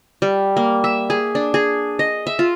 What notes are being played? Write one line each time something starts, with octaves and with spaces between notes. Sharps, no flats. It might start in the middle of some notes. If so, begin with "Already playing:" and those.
G3
A#3
E5
G#4
D4
G#4
D#5
E5
F4